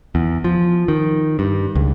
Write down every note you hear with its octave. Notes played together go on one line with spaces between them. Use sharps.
E2
F3
D#3
G2
C#2